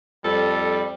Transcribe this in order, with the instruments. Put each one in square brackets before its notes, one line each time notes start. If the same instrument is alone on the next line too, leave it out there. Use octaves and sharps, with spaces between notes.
[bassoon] F2 [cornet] G3 [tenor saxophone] A4